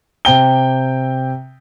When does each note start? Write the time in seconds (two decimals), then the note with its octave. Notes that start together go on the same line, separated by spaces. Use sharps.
0.25 C3 G5 G7